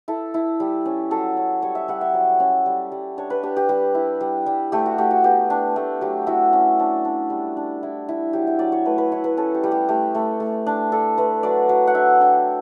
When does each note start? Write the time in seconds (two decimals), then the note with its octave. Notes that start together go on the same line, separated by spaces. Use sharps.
0.08 E4 A4
0.34 E4
0.60 G3
0.86 C#4
1.11 F#3 A4
1.37 C#4
1.62 G3 C#5
1.75 E5
1.88 G3 F#5
2.01 E5
2.14 F#3
2.40 C#4
2.66 G3
2.92 G3
3.18 D4 C#5
3.30 B4
3.43 D4 G4
3.57 G4
3.69 G3 G4
3.95 E4
4.21 G3
4.46 G3
4.72 A3 G4
4.86 F#4
4.98 A3 G4
5.11 F#4
5.24 B3 G4
5.50 D4
5.76 A3
6.01 F#3 G4
6.27 E4 F#4
6.53 C#4
6.80 D4
7.05 D4
7.30 G3
7.57 D4
7.83 E4
8.09 E4
8.33 F#3 G4
8.47 E5
8.59 F#3 D5
8.72 C#5
8.85 A3 B4
8.98 B4
9.12 E4 C#5
9.24 B4
9.37 C#4 A4
9.55 G4
9.63 G3
9.71 G4
9.88 A3 G4
10.15 A3
10.40 A3
10.66 D4
10.92 D4 A4
11.18 A3 B4
11.43 F#3 D5
11.69 F#3
11.87 F#5
11.95 D4 E5
12.20 D4 G5